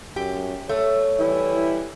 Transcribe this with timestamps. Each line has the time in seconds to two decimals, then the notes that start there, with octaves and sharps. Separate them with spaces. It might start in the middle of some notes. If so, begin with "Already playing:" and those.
0.16 F#2 G4
0.69 A3 C#5
1.19 E3 G3 E4